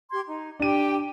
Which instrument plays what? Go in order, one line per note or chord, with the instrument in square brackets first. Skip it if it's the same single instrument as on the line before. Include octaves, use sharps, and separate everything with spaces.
[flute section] G4 C6 G#6
D#4
[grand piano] D4 D#7 [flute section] G4 G5